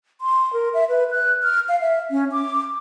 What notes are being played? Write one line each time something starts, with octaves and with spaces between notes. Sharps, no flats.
C6
A#4
E5
B4
F#6
F6
F5
E5
C#4
D6